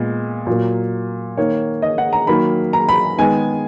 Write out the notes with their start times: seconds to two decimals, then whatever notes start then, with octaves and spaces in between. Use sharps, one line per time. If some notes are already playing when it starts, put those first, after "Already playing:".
Already playing: A#2 G#3 B3
0.47 A#2 F#3 A#3
1.37 D#3 A#3 C#5
1.82 D#5
1.98 F#5
2.13 A#5
2.27 D#3 F#3 A#3 B5
2.73 A#5
2.89 B5
3.18 D#3 G#3 B3 G#5